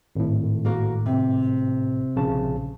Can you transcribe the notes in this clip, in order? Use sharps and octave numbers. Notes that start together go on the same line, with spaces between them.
G#1 A2
A#3 F#4 A#4
C3
A#1 C#3 A5